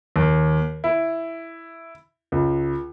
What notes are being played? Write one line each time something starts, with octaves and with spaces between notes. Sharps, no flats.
D#2
E4
C#2